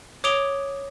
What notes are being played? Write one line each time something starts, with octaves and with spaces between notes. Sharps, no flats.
C#5 D6 D#6 D7 F7 G7